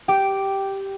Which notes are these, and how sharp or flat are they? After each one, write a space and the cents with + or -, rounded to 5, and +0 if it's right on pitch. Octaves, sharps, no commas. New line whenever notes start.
G4 -5 G5 -10 D6 +0